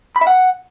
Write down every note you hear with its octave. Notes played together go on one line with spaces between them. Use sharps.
B5
E5
F#5